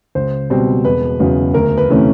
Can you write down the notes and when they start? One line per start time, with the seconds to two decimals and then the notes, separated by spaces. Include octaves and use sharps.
0.15 C#2 C5
0.50 B2 G3 C4
0.85 E1 B4
1.20 E2 C#3 F#3
1.54 D2 A#4
1.78 B4
1.89 C3 E3 A3 C#4